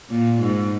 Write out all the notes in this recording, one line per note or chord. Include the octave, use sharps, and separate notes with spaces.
A#2
G#2